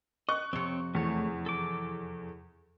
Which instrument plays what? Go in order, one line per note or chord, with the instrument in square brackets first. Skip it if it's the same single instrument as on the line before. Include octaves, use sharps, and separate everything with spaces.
[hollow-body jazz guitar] D#5 [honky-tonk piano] C#6 F#6
[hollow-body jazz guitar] F2 C3 [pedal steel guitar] C4 C#5
[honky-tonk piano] E2 [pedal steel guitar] A3 C#5
[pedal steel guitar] A4 D6